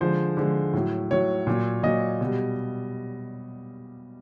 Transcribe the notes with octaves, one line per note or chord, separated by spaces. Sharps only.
D3 F3 G#3 C5
D3 F3 G#3
A2 F#3
A2 F#3 C#5
A#2 F#3
A#2 F#3 D#5
B2 G3